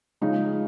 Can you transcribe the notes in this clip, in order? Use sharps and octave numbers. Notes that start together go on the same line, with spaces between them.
C#3 F3 G#3 D#4